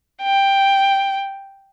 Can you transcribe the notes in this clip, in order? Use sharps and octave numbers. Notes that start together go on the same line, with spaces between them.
G5